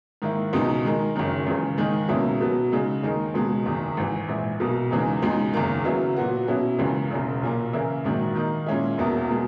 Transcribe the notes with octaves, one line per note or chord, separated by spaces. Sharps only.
G#2 D#3 A#3 E4
C#2 B2 G#3 D#4
D#3 G#3 D#4 A#4
F#1 F#2 D#3
C#2 C#3 E3
G#2 D#3 A#3 D#4 G#4
C#2 B2 A#3 C#4 E4
B2 F#3 B3
C#3 G#3 D#4
D#2 D#3 G#3 D#4 A#4
C#2 B2 G#3
F#1 E2 D#3 G#3
G#1 G#2 E3
A#1 G#2 E3
B1 B2 A#3
E2 C#3 E3 G#3 D#4
C#2 B2 G#3 D#4
F#1 E2 D#3 A#3
C#3 F#3 B3 E4
A#2 F#3 B3 F#4
B2 F#3 C#4 E4
C#2 C#3 E3 A#3
E1 E2 C#3
B1 A#2 A#3
C#3 E3 A#3 E4 A#4
A#1 G#2 D#3 F#3 A#3
D#3 A#3 D#4
A#2 G#3 C#4 E4
E1 E2 B2 A#3 E4
B2 G#3